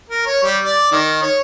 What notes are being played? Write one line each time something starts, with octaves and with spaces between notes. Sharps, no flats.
A#4
C#5
G3
D5
D#3
C#5